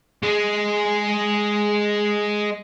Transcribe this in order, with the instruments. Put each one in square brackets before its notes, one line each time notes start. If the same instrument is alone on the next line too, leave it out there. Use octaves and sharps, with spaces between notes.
[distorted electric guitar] G#3 G#4